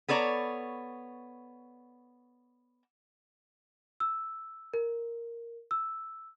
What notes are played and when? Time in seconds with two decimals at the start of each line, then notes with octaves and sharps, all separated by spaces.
0.08 B3 A4 C#5 D5 A#5
4.00 E6
4.74 A#4
5.71 E6